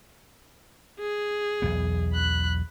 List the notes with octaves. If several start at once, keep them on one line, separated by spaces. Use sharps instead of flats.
G#4
B1 E2 B3
B5 F#6